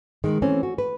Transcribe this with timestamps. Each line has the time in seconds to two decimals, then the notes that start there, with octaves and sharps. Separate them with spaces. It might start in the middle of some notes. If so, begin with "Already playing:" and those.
0.24 D#3 G#3
0.42 E3 A3 C4 C#4
0.63 F#4
0.78 B4